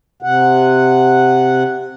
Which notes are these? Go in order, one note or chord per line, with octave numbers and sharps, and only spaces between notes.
C3 F#5